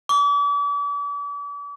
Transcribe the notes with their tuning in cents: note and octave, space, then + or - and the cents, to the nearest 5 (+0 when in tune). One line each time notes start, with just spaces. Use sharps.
D6 -40